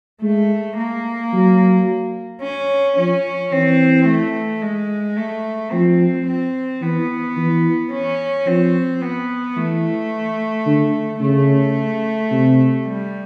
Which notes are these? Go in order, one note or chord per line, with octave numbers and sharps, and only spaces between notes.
G#3 A3
A#3
F#3
C#4
F3 C#4
E3 C4
A3
G#3
A3
F3 C4
C4
E3 B3
E3
C#4
F3 C4
B3
E3 A3
D3
C#3 A3
C3
G3